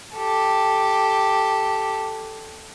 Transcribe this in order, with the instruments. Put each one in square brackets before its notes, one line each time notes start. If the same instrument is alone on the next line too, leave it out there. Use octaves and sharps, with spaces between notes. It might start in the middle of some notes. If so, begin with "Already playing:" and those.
[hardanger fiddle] G4 A4